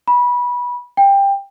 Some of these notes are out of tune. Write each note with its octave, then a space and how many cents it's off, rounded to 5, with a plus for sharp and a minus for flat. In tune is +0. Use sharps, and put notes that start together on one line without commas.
B5 -20
G5 +20